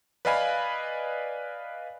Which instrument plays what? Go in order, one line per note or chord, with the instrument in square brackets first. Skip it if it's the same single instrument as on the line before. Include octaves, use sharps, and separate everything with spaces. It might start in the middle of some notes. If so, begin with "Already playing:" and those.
[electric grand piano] B4 D5 D#5 F5 G#5 B5